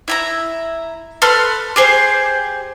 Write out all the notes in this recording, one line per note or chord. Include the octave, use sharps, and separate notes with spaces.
E4 E5 A#5
A4 B4 C6 F6
G4 G#4 C5